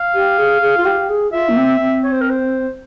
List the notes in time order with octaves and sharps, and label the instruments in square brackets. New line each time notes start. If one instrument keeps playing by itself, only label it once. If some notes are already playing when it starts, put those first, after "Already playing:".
Already playing: [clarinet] F5
[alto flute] G4
G#4
G#4
F4
G4
G#4
[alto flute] F4 [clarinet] E5
[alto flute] A#3
C4
C4
[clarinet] C#5
C5
A#4
C5